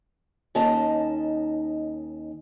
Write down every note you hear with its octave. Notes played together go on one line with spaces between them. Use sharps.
D#2 C#4 D#4 D#5 A5